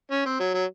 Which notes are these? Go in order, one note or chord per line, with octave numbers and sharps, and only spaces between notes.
C#4
C4
F#3
F#3